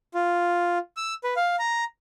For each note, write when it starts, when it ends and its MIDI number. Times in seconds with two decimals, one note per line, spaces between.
0.14 0.78 65
0.97 1.14 88
1.24 1.34 71
1.36 1.56 77
1.59 1.84 82